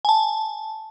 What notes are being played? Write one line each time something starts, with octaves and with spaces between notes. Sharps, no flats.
G#5 A5